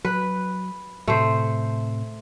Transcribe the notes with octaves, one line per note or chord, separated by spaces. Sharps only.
F#3 B4
A2 C3 A3 C5